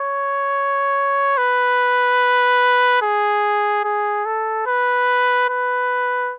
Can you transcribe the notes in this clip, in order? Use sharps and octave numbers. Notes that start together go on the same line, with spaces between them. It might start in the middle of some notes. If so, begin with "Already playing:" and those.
Already playing: C#5
B4
G#4
G#4
A4
B4
B4